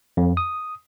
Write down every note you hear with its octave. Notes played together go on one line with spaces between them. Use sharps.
F2
D#6